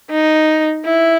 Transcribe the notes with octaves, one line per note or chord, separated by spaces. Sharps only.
D#4
E4